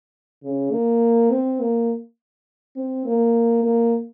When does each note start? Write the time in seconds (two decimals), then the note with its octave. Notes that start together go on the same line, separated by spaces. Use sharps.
0.43 C#3
0.72 A#3
1.30 C4
1.60 A#3
2.76 C4
3.06 A#3
3.64 A#3